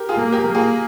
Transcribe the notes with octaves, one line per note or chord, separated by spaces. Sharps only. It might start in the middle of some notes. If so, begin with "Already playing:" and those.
Already playing: G4 A#4
F4 G#4
A#3
G4 A#4
A#3
F4 G#4